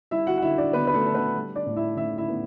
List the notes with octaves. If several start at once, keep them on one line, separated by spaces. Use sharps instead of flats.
G3 E4 E5
F#4 F#5
F#5
D3 E4 E5
D4 D5
D3 B3 B4
B4
A3 A4
D4 A4
B3 B4
G3
D4 D5
A2
E4 E5
A2 E4 E5
E4 E5
B3